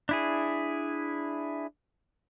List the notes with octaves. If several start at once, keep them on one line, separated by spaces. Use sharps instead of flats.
D4 E4 G#4